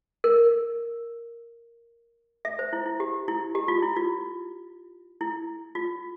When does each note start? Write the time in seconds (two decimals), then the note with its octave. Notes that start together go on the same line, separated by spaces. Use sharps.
0.24 A#4
2.45 E5
2.59 C5
2.73 E4
2.86 E4
3.00 G4
3.28 E4
3.55 G4
3.68 F4
3.82 E4
3.96 F4
5.21 E4
5.75 F4